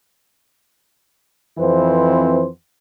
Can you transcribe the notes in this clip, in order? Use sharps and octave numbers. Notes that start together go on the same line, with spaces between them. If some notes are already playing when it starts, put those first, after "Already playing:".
F2 E3 C4 B4 C5